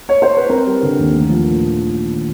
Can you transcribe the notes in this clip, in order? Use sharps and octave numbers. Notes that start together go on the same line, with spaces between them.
C#5
C5
B4
C4 A#4
G3
D3
D#2
A3
F3
A#2